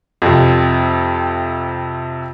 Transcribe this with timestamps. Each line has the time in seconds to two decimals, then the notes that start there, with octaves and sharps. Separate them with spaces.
0.22 F2 C3